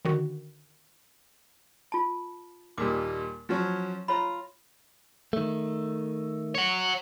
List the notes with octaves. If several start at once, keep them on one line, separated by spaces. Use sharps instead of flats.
D3 D#3 F#4
F4 A5
D#2 A#2 G3 D6
F3 F#3 C#4
F4 C#5 A#5 B5
D#3 A3
C#5 F#5